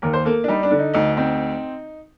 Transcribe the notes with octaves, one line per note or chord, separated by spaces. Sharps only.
D#2 A#4
C5
A#3 A4
D4
G3 D#4
D4
D3
D#4
D2 D#4
C4 D#4